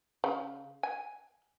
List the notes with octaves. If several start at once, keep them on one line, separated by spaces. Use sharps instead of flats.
C#3
G#5